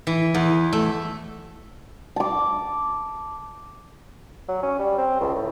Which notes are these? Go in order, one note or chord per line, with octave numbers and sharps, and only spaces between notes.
E3
E2
A3
A5 D6
F#3
C#4
G3
C4
C#2
A2